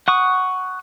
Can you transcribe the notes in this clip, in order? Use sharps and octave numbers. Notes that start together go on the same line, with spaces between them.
F#5 C#6 D#6